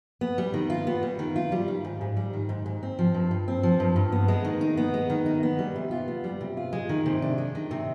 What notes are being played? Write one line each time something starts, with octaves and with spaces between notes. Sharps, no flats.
B3
G3
D#3
F4
B3
G3
D#3
F4
G3
D#3
G#2
G#2
G3
D#3
G#2
G#2
C4
F3
G2
G2
C4
F3
G2
G2
B3
G#3
D#3
D#4
B3
G#3
D#3
D#4
B3
G3
C3
F4
B3
G3
C3
F4
G#3
D#3
C3
D4
G#3
D#3
C3